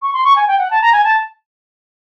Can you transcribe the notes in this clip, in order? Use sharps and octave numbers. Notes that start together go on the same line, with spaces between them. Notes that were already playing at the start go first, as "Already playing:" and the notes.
C#6
C6
C#6
G#5
G5
F#5
A5
A#5
G#5
A5